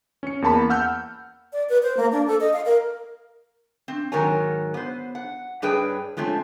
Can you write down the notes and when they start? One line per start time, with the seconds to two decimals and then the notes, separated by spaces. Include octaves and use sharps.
0.23 C#4 C#7
0.42 E2 A#3 A5 B5
0.70 F#5 E6 F6 G6
1.53 D5
1.69 B4
1.83 C5
1.97 A#3
2.12 D4
2.27 A4
2.40 D#5
2.53 F5
2.65 A#4
3.88 C4
4.12 G#2 D#3 F#3 A#4 C#5 G#5
4.74 B3 C5
5.15 F#5
5.62 G2 G3 G#4 B4 C#5 G5
6.17 F3 G#3 A3 C4 C#4